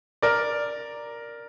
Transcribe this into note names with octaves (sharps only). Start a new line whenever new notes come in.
A#4 D5